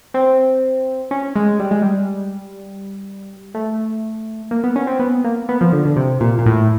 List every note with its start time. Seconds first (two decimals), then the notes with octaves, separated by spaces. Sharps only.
0.14 C4
1.11 C#4
1.36 G#3
1.60 G3
1.71 G#3
1.82 G3
3.54 A3
4.51 A#3
4.64 B3
4.76 C#4
4.87 C4
4.99 B3
5.24 A#3
5.49 B3
5.61 F3
5.72 D3
5.85 D3
5.96 C3
6.20 A#2
6.39 A#2
6.46 A2